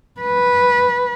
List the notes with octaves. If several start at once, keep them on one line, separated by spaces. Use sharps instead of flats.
B4